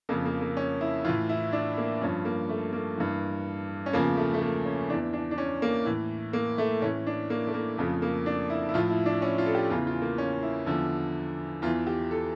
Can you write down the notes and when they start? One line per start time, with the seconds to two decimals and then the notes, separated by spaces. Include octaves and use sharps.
0.09 F2 C#3 F3 A#3
0.25 A#3
0.41 A#3
0.57 C#4
0.81 E4
1.05 A2 E3 F4
1.29 E4
1.52 D4
1.77 A#3
2.01 G2 F3 C#4
2.25 A#3
2.49 A3
2.73 A#3
2.97 G2 E3
3.86 C#4
3.93 E2 C#3 F3 A#3
4.17 A3
4.34 A3
4.42 A#3
4.65 C#4
4.89 E2 E3 D4
5.13 D4
5.31 D4
5.38 C#4
5.62 A#3
5.85 A2 E3
6.33 A#3
6.58 A3
6.81 A2 E3 C#4
7.07 D4
7.30 A#3
7.47 A3
7.54 A#3
7.78 F2 C#3 F3 A3
8.02 A#3
8.26 D4
8.50 E4
8.69 E4
8.74 A2 F3 F4
8.90 E4
9.06 D4
9.22 C#4
9.38 F4
9.46 A4
9.55 G4
9.70 E2 C#3 E3 F4
9.87 F4
10.02 A#3
10.18 C#4
10.43 E4
10.66 E2 D3 F3
11.62 E2 E3 F4
11.87 G4
12.11 A4